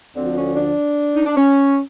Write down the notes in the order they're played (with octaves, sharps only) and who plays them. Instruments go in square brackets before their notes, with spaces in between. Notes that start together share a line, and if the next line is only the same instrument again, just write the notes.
[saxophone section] D2 D3 F3 C4
C#4
D4
D#4
D4
C#4